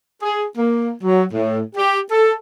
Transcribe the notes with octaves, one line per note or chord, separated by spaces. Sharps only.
G#4
A#3
F#3
A2
G4
A4